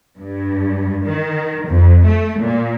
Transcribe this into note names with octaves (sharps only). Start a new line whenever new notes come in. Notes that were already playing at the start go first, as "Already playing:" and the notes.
G2
D#3
F2
A3
A#2